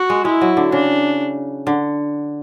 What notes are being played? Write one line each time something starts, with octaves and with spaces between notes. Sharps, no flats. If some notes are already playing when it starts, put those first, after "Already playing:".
Already playing: F#4
G#3
G#3 E4
F#3
D3
C#3 D4
D3